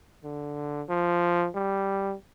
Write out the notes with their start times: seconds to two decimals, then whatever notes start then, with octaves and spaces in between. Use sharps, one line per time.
0.24 D3
0.89 F3
1.55 G3